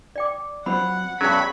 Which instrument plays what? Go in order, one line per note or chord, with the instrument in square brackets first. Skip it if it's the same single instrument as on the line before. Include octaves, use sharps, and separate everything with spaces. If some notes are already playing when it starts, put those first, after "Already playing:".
[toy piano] D5 G5 D6
[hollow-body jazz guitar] F#3 C4 F4 [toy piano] C5 B5 [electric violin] F#5
[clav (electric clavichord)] G2 F#3 [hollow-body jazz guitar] B2 G#4 C#5 [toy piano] C#4 [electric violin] B5 C#6